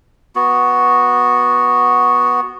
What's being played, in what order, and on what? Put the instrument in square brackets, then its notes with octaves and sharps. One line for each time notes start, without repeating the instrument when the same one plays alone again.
[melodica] B3 F#4